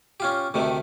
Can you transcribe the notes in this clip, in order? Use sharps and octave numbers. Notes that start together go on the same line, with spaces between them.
C#4 F4 G4
D2 C3 D#3 A3